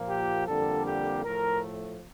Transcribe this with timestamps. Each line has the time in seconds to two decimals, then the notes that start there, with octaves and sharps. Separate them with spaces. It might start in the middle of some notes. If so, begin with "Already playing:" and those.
Already playing: A#2 F3 A#3
0.08 G4
0.47 F2 D3 G3 A#3 A4
0.86 G4
1.24 A2 F3 A3 A#4